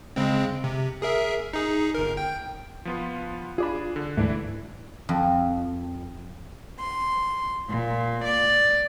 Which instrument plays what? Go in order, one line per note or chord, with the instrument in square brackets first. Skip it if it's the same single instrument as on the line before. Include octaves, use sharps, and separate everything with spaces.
[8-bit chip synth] C#3 G#3 C4
C3
G#4 A#4 E5
D#4 G#4
G1 A#4
G5
[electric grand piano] F3 B3 F4
[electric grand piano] D4 G#4 [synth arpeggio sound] F4 D5 B5
[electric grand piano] D3
[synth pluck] D2 G#2 [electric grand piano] E3 D4 E4 [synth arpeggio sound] A3
[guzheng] F2
[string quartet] C6
A#2
D5